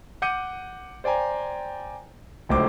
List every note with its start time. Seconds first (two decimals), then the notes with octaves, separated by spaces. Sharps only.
0.22 F#5 D6 G6 C#7 D#7
1.04 C5 D5 G5 G#5 A#5
2.49 D1 C#2 A3 C5 D6